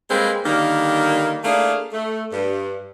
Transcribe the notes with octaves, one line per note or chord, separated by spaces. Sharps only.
G3 G#3 A#3 C4 B4
D3 D#3 G3 A#3
A3 A#3 D4 E4 G#4 F5
A3
G2